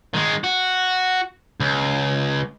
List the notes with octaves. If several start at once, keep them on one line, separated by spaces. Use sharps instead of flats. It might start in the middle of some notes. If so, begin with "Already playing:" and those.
D#3 G#3
F#4
C#2